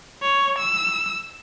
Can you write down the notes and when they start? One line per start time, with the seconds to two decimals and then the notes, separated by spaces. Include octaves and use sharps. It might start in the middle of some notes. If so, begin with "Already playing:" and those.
0.22 C#5
0.58 E6